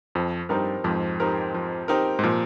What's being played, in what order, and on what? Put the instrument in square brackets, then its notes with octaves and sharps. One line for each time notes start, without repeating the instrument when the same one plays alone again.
[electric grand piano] F2 [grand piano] F3
[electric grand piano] G2 [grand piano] C4 D#4 G4 A#4
[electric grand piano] F2 G#2 [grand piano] F3
[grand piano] C4 D#4 G4 A#4
F3
C4 D#4 G4 A#4
[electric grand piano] G#2
[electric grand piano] A#2 [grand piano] F3